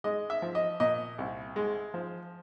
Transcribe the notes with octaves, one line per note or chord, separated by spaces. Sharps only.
G#3 D#5
E5
F3
D#5
A#2 D#5
C2
G#3
F3